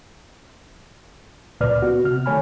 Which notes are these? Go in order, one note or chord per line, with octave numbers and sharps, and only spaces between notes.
C#2 A#2 B4 D5 F6
B3 F#4
C3 F6
D#3 A3 C#5 G#5 B5